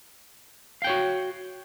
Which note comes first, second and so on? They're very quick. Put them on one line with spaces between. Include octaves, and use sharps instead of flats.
F5 G5 C#5 F#4